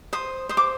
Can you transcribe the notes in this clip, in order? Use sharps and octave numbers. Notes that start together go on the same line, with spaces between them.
C5 D#6
C5 D#6
D6